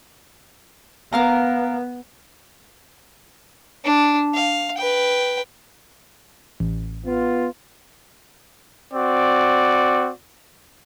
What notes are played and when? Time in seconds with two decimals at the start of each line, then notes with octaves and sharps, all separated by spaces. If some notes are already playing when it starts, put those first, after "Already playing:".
1.13 B3 A#4 F5 A#5
3.85 D4
4.35 F5
4.77 B4 G5
6.60 A1
7.06 B3 F4
8.94 C4 F#4 D5